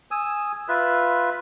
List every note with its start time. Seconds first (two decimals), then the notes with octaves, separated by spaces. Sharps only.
0.11 G#5 D#6 E6
0.68 F4 B4 E5